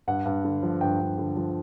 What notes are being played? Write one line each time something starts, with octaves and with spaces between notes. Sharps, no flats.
G2 F#5
G2
D3
F3
G2 G5
G2
D3
F3